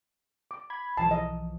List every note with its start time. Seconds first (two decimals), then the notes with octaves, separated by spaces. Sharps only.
0.51 D6
0.70 B5 G#6
0.97 B1 E3 F3 A5
1.11 D#5